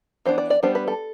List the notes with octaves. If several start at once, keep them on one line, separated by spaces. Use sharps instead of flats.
E3 B3 D4 C5
D5
D5
G3 B3 D4 C5
B4
A4